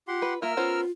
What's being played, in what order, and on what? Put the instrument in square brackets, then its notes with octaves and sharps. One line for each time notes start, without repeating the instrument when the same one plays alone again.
[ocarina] F4 [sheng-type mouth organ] G4 F#5 C6
[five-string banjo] B4
[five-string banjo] A#3 F4 [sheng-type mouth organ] A#4 E6 F6 [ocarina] E5
[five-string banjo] B3 C#4 C5 [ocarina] F4